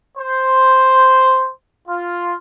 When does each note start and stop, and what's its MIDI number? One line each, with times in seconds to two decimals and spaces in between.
0.17 1.51 72
1.88 2.34 65